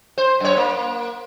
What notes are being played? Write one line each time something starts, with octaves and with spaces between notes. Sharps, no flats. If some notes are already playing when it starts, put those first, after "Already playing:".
C5
F#2 C#5
A#3